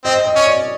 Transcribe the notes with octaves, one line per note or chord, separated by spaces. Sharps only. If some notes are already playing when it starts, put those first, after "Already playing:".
C4 D#5
D#5
C#4
D5